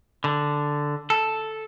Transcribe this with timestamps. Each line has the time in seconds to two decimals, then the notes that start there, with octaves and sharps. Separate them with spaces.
0.24 D3
1.10 A4